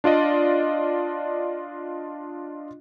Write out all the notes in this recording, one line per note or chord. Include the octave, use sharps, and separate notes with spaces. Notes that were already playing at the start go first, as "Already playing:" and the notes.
D4 F4 D5 D#5